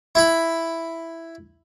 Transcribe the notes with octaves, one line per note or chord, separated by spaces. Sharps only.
E4 B5